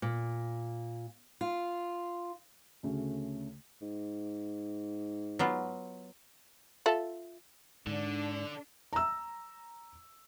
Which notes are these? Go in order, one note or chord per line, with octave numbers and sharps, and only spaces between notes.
A#2
F4
D2 C#3 A3 C#4
G#2
F#3 B3 F4
F4 A4 E5
G#2 D3 D4
A#5 E6